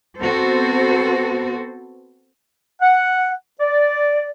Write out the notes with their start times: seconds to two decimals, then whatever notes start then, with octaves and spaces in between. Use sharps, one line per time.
0.21 B3 C4 F#4 A4 C5
2.82 F#5
3.60 D5